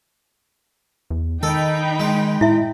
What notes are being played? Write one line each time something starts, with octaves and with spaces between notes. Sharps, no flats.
E2
D#3 D#4 A4 G5 B5
G#3
A2 E4 E5